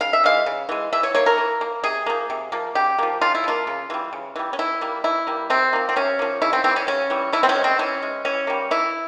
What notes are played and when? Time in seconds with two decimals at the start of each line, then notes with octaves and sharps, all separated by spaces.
0.01 C#3 F5
0.13 E5
0.24 E3 G#3 F5
0.46 C#3
0.69 E3 G#3
0.93 E3 E5
1.03 C#5
1.15 A#3 C#5
1.26 A#4
1.38 E3
1.61 A#3
1.83 C3 G#4
2.06 F3 A#3
2.30 C3
2.52 F3 A#3
2.75 C#3 G4
2.99 F3 A#3
3.21 C#3 F4
3.35 E4
3.44 F3 A#3 F4
3.67 C#3
3.90 E3 G3
4.13 C#3
4.36 E3 G3
4.53 C#4
4.59 E3 E4
4.81 G3 A#3
5.04 E3 E4
5.27 G3 A#3
5.50 C3 C4
5.73 F3 A#3
5.89 C4
5.96 C3 C#4
6.19 F3 A#3
6.42 C#3 E4
6.53 C4
6.64 E3 G3 C4
6.76 C#4
6.87 C#3 C#4
7.10 E3 G3
7.33 E3 E4
7.43 C4
7.49 C#4
7.55 G#3
7.64 C4
7.79 E3 C#4
8.02 G#3
8.25 E3 C#4
8.47 G3 A#3
8.71 E3 E4